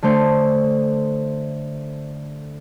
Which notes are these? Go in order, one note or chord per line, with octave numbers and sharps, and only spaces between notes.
D3 A3 C5 C#5